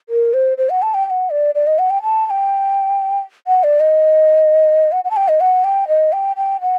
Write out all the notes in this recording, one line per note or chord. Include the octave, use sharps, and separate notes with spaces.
A#4
C5
C5
F#5
A5
G5
G5
F#5
D5
D5
D#5
F#5
G5
A5
A5
G5
F#5
D5
D#5
F#5
F#5
A5
G5
D#5
F#5
G5
D#5
G5
G5
F#5